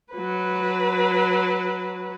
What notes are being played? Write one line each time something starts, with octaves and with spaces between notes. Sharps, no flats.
F#3 B4